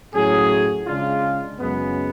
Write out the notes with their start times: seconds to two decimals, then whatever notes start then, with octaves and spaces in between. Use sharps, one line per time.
0.14 A2 F#3 C#4 G#4
0.87 C#3 G#3 D4 F4
1.59 F#2 C#3 G#3 B3